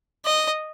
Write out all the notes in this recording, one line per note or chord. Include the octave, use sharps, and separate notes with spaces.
D#5